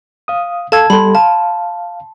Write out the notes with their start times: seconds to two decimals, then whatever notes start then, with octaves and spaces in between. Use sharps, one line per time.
0.28 F5 D#6
0.72 A4 F5 A5 E6 G#6
0.90 G3 G4 A4 B5 C6
1.15 F5 A5